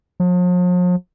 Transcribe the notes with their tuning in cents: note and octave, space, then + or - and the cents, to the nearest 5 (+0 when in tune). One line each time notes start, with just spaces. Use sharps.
F3 +45